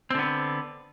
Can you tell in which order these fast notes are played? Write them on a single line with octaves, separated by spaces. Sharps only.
C4 D3 B3